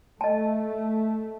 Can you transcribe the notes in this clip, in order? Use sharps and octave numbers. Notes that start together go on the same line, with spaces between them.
A3 D#5 A5